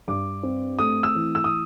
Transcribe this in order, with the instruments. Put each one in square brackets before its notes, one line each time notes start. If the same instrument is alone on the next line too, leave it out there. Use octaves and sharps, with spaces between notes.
[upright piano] G2 [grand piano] D6
[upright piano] C4
[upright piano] A3 [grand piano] D#6
[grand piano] E6
[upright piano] E3
[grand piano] E6
D#6